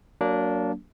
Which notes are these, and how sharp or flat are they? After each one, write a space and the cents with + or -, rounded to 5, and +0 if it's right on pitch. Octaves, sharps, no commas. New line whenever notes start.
F#3 +15 A#3 +0 D4 -15